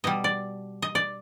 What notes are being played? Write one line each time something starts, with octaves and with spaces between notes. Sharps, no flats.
B2 G3 D#5
D5
D#5
D5